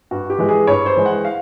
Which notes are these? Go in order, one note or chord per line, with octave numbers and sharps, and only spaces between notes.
G2 F#4
G4
E3 G#3
G#4
G2 C#5
C5
E3 G#3
F#5
F5